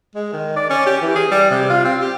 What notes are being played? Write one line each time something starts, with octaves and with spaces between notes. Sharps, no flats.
G#3
D#3
D5
C#4
G4
E3
G#4
G3
C3
F4
C4
G4